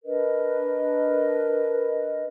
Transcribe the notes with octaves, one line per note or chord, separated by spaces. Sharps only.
D4 A#4 B4 D#5